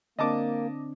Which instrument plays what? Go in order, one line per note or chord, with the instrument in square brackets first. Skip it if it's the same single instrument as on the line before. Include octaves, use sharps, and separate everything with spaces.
[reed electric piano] D3 C4 D4 [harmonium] A#3 [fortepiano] D#5 A5 D6